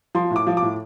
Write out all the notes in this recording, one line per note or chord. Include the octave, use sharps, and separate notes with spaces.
F3 C6
A2
D6
F3
D6
A2